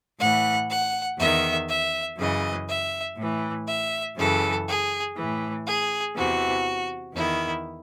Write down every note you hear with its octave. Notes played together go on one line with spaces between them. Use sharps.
A2 E3 F#5
F#5
E2 D#3 E5
E5
F#2 C#3 E3 D#5
E5
A2 E3
E5
F#2 C#3 E3 A4
G#4
A2 E3
G#4
E2 C3 E3 F#4
E2 D#3 E4